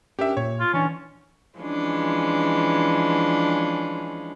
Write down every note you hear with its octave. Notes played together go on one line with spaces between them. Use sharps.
C#4 D4 G4 A#4 E5
A#2 C#5
F4
E3 C#4 D4
E3 F3 G#3 C#4 D4